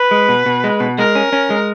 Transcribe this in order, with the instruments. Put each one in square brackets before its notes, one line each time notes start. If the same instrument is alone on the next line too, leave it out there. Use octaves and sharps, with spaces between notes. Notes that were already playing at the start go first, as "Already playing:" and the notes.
Already playing: [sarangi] B4
[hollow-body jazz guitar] G#3
B2
B2
G#3
B2
[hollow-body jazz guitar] G#3 [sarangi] A#4
[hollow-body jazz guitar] C#4
C#4
G#3